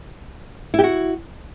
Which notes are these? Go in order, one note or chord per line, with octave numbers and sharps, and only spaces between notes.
E4 F#4 G4